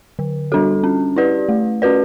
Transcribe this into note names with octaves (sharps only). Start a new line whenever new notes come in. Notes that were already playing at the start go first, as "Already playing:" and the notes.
D3
G3 D4 F#4 A4
C#4
E4 G4 B4 D5
A3
C#4 F#4 B4 D5